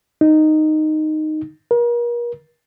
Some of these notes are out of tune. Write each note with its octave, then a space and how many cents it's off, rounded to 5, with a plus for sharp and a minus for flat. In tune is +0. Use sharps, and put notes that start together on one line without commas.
D#4 -5
A#4 +40